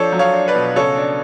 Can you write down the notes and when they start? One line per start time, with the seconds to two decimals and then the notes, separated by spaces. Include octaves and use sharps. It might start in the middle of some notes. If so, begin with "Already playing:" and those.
Already playing: F3 D4 A4 C#5
0.13 F#3
0.19 C#5 F5
0.33 D4
0.48 B4 D5
0.55 B2
0.76 C#3 A4 C#5
0.97 D4